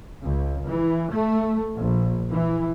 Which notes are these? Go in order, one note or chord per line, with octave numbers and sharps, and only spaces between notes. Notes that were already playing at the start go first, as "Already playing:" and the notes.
C#2
E3
A3
A#1
E3